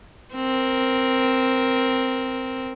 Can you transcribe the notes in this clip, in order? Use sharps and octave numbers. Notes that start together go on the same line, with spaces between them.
C4 A#4